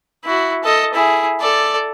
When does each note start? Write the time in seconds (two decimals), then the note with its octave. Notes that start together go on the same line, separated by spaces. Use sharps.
0.25 E4 F#4
0.64 A4 D#5
0.94 E4 G#4
1.40 A4 D5